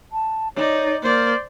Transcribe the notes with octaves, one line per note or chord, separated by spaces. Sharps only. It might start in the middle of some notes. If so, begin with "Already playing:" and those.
A5
D#4 C#5 D5
A#3 C5 D5